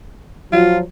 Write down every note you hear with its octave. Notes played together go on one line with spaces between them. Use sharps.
F3 F#3 F4